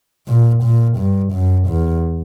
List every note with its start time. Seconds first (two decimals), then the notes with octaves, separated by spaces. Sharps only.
0.28 A#2
0.63 A#2
0.97 G2
1.33 F#2
1.68 E2